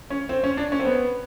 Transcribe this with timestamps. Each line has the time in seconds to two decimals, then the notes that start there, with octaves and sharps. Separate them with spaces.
0.10 C#4
0.29 C4
0.44 C#4
0.57 D4
0.72 C#4
0.80 C4
0.85 B3